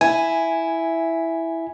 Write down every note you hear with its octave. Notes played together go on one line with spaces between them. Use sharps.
E4 G#5